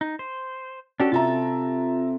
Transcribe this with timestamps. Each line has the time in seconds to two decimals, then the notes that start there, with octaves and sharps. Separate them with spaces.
0.01 D#4
0.19 C5
1.00 C#4 D4 F#4 G4 A4 D5
1.12 C3 C4 F4 A4 E5 A5 A#5